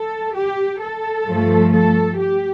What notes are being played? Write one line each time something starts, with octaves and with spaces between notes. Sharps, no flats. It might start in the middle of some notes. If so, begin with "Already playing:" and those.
Already playing: A4
G4
A4
G2 F3 A3
A4
G4